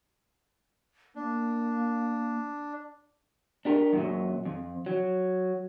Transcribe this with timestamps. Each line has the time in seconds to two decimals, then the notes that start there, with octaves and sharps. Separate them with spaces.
1.15 A#3 D4
3.65 D4 G4 A#4
3.93 F#2 A#2 F#3
4.45 F2
4.86 F#3